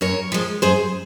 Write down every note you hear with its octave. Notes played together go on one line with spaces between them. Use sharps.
F#2 A#4 C#5
F3 G#3
F#2 G#4 C5